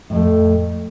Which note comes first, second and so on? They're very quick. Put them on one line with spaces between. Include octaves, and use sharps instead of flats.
A2 F2 A3